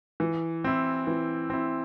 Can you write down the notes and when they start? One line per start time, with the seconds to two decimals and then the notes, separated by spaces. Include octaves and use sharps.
0.20 E3
0.64 C4 E4
1.07 E3
1.50 C4 E4